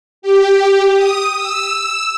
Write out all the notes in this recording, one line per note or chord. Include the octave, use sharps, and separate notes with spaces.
G4
D#6
E6